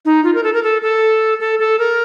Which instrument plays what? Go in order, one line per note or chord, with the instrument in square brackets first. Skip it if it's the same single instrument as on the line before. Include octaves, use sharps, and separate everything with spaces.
[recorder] D#4
F4
A#4
A4
A#4
A4
A4
A4
A4
A#4